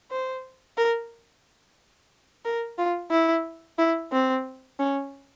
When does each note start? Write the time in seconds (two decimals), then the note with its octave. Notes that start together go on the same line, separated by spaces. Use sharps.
0.11 C5
0.77 A#4
2.45 A#4
2.78 F4
3.11 E4
3.78 E4
4.12 C4
4.79 C#4